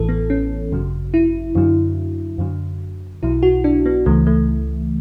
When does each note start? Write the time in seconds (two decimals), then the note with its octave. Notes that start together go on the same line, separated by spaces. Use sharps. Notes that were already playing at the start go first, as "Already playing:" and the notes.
Already playing: A1 A2 E3 A4
0.09 B3
0.30 C#4
0.72 G#1 F#2 C#3 F#3
1.14 E4
1.55 F#2 D3 F#3
2.38 F#2 D3 F#3
3.22 B1 B2 F#3 E4
3.43 F#4
3.64 D4
3.86 B3
4.06 C#2 C#3 E3 A3
4.27 A3